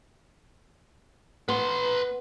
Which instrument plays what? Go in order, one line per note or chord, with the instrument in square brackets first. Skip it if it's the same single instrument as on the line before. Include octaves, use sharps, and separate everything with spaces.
[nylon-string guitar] B3 [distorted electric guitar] B4 C6